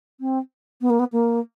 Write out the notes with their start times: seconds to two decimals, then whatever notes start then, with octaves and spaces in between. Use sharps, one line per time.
0.20 C4
0.81 B3
0.90 A#3
0.99 B3
1.12 A#3